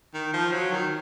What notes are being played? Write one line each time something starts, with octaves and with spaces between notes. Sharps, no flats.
D#3
F3
F#3
D#3